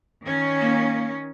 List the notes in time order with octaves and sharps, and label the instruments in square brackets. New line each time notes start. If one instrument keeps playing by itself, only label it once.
[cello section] D#3 C#4
[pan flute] A#3